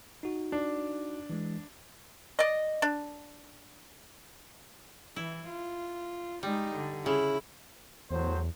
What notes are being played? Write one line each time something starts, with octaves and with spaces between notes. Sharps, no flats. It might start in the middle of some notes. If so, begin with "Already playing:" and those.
D#4 F#4
D4
E3 G#3
D5 D#5
D4
E3 E4
F4
G3 G#3 D#4
D3
C#3 E4
E2 A2 F#3 C5